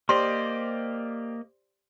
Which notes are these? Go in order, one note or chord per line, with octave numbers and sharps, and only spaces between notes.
A#3 G4 C5 D5 D#5 C6